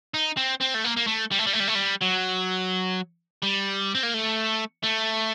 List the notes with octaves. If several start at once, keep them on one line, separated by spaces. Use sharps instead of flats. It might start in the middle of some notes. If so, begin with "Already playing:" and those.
D#4
C4
C4
A3
A#3
A#3
A3
G3
A3
G3
A3
G3
A3
G3
F#3
G3
C4
A#3
A3
A3